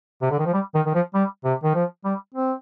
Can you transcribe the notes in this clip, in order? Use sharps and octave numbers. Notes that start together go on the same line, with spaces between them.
C3
D3
D#3
F3
G3
D#3
D#3
F3
G3
C3
D#3
F3
G3
C4